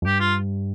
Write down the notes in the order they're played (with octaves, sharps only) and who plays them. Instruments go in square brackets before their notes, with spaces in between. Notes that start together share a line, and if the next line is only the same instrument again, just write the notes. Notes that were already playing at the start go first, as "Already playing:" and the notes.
[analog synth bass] F2
[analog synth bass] G2 [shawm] G4
[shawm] F4